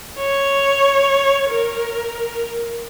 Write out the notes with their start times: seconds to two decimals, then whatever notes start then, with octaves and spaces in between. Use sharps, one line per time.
0.19 C#5
1.49 A#4